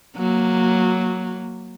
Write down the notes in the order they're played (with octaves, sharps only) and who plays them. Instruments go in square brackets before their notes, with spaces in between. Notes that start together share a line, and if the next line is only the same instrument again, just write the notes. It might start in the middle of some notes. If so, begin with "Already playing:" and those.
[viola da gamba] F#3 A#3